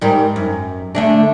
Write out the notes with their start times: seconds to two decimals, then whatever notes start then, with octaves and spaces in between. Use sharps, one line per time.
0.01 G#2 G3 A#4
0.36 F#2
0.95 D3 A3 D4